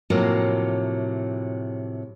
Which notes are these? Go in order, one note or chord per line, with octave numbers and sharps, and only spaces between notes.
A2 C3 F3 F#3 A#3